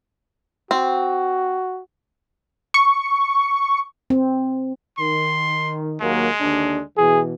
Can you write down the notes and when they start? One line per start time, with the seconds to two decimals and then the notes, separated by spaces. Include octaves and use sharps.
0.71 C4 F#4
2.74 C#6
4.10 C4
4.99 D#3 C6
6.01 D#2 F#3 G#3 A#3
6.40 D#2 D3 D4
6.98 B2 E3 G#4